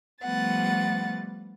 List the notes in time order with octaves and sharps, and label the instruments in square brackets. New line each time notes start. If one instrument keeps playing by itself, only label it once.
[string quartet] F3 G3 A3 B3 F#5 A6